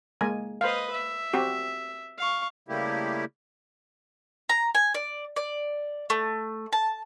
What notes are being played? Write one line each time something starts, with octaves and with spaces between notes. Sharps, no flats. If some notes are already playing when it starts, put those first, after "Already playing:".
G#3 A#3 G#5
B4 C5 D#5 F5
E5
C4 F#4 G4
F5 C#6
C#3 G3 A3 A#3 E4 G4
A#5
G#5
D5
D5
A3
A5